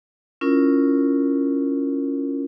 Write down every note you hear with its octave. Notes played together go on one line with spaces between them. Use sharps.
C#4 E4 F4 A#4